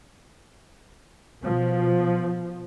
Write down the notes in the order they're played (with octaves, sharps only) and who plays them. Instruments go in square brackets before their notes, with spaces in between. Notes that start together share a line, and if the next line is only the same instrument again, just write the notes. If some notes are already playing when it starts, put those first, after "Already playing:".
[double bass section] B2 F3